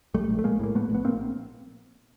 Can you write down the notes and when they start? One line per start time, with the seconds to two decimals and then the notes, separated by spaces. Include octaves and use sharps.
0.14 A#1 G3 A3
0.29 A#1
0.39 A3
0.44 A#1 G#3 A#3
0.60 A2 A#3
0.75 A2 A3 B3
0.90 A#1 B3
1.05 A#1 A#3 C4